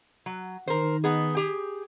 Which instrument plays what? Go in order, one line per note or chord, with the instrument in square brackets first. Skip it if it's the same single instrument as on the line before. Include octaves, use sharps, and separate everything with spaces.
[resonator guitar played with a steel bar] F#3
[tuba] D#3 [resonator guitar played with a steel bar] A#4 C5
[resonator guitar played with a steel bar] B3 D#4 G#4
G4 G#4